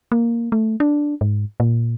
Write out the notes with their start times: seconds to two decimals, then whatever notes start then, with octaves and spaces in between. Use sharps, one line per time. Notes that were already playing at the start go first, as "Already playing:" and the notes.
0.12 A#3
0.52 A3
0.80 D4
1.21 G#2
1.60 A#2